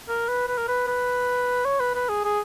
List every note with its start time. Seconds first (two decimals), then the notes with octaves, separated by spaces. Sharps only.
0.09 A#4
0.29 B4
0.48 B4
0.57 A#4
0.68 B4
0.87 B4
1.65 C#5
1.80 B4
1.95 B4
2.09 G#4
2.24 G#4